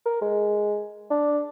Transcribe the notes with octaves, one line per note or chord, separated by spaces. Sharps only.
A#4
G#3
D4